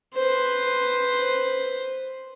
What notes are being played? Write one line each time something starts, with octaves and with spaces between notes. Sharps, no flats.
B4 C5